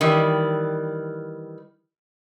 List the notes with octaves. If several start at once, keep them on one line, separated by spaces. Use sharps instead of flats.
D#3 E3 G3